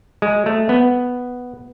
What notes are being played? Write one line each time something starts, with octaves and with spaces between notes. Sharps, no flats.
G#3
A3
B3